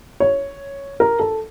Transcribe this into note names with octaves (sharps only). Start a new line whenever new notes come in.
C#5
A#4
A4